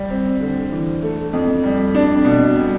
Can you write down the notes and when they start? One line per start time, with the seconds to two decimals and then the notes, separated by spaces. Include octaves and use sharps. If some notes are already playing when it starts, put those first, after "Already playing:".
Already playing: G3
0.10 C4
0.41 D3
0.71 E3
1.02 A3
1.33 F2
1.63 G3
1.95 D4
2.25 B2
2.55 G3